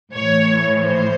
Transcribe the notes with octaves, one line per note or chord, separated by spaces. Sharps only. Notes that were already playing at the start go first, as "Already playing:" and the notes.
A2 E3 C#5
C5